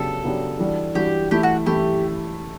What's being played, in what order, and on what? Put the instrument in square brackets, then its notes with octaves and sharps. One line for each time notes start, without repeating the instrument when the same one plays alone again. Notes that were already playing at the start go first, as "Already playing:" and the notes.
Already playing: [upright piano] C#3 F#3 B3 D4 G4 [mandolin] A4
[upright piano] C#3 F#3 B3 D4 G4
E3 G3 D4 F#4
[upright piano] E3 G3 D4 F#4 [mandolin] G4
[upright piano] E3 A3 E4 [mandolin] G4
[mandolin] F#4
[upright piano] E3 A3 E4 [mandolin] G4